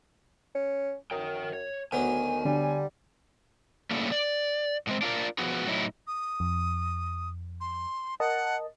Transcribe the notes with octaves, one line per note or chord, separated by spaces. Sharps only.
C#4
F#2 A#4 G5
C#5
D2 D#3 F#3 B3 G#5
D3 G3
A2 C#3 G3 A3 A#3
D5
A2 G#3 C4
D4 F4 F#4 A#4 D5
F3 B3 F#4 G#4
A2 F#3 D#4 E4
D#6
F2
C6
A#4 D#5 F#5 A5